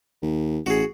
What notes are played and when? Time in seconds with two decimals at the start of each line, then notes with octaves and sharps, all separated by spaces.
0.22 D#2
0.66 A1 F#4 G#4